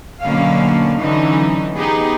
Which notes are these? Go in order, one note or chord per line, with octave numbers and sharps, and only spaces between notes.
B2 D3 F#3 A#3 C#4 F5
D3 E3 F#3 C#4 D#4
B3 D#4 G4 G#4